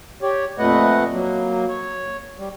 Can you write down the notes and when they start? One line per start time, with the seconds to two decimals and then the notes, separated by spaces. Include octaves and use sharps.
0.22 G4 C#5 D5
0.59 F2 A#2 A3 B4 D#5 F#5
1.11 F#3 A#3
1.69 C#5
2.38 G3